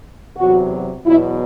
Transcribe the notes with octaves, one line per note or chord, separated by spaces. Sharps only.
E2 C3 F#3 F#4
E2 B2 F#3 E4